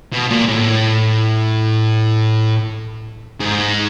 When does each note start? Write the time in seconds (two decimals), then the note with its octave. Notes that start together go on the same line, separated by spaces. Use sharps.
0.12 B2
0.30 A#2
0.48 A2
3.40 G#2